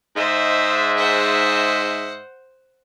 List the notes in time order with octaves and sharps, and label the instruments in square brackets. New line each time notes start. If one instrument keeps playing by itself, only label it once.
[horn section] G#2 D#5 E5 [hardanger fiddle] C5
[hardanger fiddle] C5 F#5